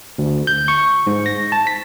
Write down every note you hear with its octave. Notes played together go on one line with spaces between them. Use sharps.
D2
G6
C#6
G#2
A#6
A5
B6